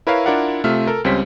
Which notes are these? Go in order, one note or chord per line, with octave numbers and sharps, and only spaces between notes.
E4 A#4 B4 C#5 E5 F5
D4 E4 F4 A#4 D5 F#5
C3 A3 F4 E5 F6
A4 A#4
C#2 G3 C4 C#4 C5 B6